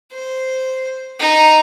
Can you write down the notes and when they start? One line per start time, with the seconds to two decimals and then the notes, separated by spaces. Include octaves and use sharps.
0.12 C5
1.19 D#4